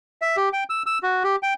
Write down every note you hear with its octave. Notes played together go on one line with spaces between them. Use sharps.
E5
G4
G5
E6
E6
F#4
G4
G5